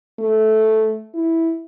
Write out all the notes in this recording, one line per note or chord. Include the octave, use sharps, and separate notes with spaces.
A3
E4